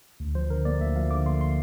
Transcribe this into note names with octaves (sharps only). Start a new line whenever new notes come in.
D2
F3 C5
D3 A#4
A#3 D5
D2 E5
F3 F5
D3 D6
A#3 C6
C6